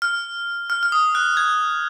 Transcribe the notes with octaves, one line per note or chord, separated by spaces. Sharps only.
F6
F6
F6
D#6
F#6
G#6